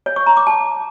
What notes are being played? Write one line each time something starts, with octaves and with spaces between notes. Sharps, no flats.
C#5
C#6
A#5
D6
A5